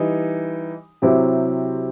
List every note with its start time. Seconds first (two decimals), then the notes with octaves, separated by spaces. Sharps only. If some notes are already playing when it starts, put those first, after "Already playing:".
Already playing: E3 G3 D#4
1.02 C3 F#3 C4 E4 G4